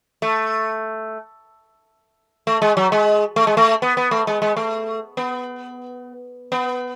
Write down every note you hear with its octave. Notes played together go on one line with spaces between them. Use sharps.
A3
A3
G#3
F#3
G#3
A3
G#3
A3
B3
B3
A3
G#3
G#3
A3
B3
B3